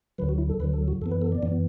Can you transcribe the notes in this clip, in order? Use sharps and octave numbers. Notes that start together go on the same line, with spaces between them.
D2 D3 F#3 B4
F#4
E4
A4
D2 D3 F#3 B4
A4
F#4
F#2 E3 B3 A4
B4
A4
D5
F#2 E3 B3